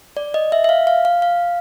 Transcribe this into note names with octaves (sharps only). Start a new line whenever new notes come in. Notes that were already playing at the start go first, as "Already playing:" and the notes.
D5
D#5
E5
E5
F5
F5
F5
F5